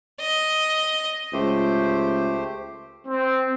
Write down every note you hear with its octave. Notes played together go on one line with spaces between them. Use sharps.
D#5
C#2 A3 G4 C5
C4